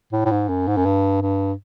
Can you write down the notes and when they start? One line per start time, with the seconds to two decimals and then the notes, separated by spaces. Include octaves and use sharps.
0.12 A2
0.25 A2
0.31 G#2
0.49 F#2
0.68 G#2
0.77 F#2
0.86 G2
1.22 G2